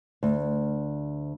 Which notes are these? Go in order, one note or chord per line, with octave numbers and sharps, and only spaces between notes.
D2